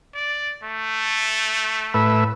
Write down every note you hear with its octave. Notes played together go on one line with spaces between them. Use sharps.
D5
A3
A2 B4 E5